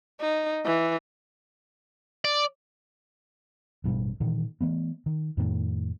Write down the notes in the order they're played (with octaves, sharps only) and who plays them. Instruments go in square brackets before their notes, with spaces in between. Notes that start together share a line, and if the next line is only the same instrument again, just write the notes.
[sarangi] D#4
E3
[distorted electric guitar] D5
[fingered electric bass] A1 G2 B2 G3
A#2 D#3 E3
E3 A3 B3
D#3
F2 A2 D#3 A3